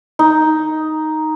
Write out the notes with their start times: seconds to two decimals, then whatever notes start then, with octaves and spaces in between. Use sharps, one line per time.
0.19 D#4